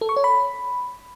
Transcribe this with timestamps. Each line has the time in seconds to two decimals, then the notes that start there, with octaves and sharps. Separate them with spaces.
0.01 A4
0.09 C#6
0.16 C#5
0.24 B5